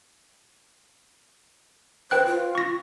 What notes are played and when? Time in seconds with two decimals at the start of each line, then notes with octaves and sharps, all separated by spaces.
2.11 B4 C5 G5 F#6
2.26 F4
2.55 C#6 A#6